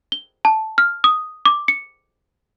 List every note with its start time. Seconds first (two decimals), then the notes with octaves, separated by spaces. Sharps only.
0.12 G7
0.45 A5
0.78 F6
1.04 D#6
1.46 D6
1.68 C#7